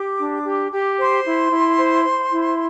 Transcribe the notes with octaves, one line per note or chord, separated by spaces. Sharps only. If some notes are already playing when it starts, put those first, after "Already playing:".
Already playing: G4 D6
D4
G4
G4
C5 C6
E4
E4
C5
C5
E4